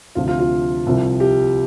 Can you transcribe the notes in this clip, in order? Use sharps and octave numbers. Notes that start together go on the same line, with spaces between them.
D2 C3 F3 F4
F4
F4
C2 C3 F3
G4